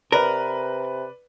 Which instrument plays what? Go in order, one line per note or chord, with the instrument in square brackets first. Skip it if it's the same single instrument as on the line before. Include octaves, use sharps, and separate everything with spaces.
[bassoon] C3 [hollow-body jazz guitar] A#4 [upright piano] B4 D5